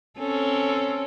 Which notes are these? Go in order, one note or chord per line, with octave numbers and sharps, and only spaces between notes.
C4 C#4 A4